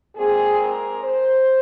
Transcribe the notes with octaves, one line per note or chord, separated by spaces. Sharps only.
A#2 G#3 C4 G#4
A#4
C5